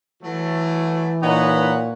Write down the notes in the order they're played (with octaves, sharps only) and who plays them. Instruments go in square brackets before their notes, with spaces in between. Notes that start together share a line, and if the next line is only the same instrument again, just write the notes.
[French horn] E3 [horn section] F#3 A3
[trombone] A#2 [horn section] D#4 B4 [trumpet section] C#5 F#5